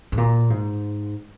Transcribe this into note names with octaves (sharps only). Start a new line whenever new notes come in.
G#2
A#2
G#2